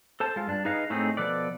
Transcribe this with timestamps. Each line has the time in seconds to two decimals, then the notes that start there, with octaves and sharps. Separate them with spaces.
0.20 A4 C5 A5
0.36 G#3 F4
0.47 G2 D4
0.65 D#4 G#4 B4 D#5 F5
0.90 A2 A3 C4 D#4 G#4
1.17 B2 F3 A4 B4 D5